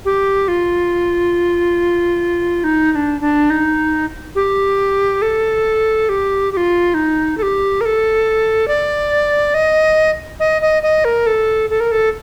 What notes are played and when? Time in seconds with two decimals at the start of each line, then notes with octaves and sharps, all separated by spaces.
0.05 G4
0.48 F4
2.64 D#4
2.92 D#4
2.95 D4
3.21 D4
3.50 D#4
4.35 G4
5.22 A4
6.09 G4
6.52 G4
6.57 F4
6.94 D#4
7.38 A4
7.43 G4
7.81 A#4
7.85 A4
8.68 D5
9.54 D#5
10.40 D#5
10.62 D#5
10.83 D#5
11.05 A#4
11.27 A4
11.70 A4
11.80 A#4
11.92 A4